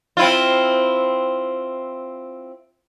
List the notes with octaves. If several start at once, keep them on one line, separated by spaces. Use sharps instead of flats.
C4 E4 F4